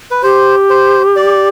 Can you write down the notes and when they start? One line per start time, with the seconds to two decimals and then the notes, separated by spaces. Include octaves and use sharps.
0.11 B4
0.23 G4 C5
0.70 C5
1.16 D5